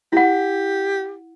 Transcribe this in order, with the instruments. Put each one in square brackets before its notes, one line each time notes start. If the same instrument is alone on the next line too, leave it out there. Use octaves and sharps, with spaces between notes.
[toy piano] E4 F#5 [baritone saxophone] G4